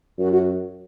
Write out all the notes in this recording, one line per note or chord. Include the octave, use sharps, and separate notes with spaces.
F#2 F#4
F#4